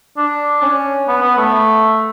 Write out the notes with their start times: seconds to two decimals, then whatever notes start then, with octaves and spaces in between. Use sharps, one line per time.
0.17 D4
0.62 C#4
1.08 B3
1.22 B3
1.37 A3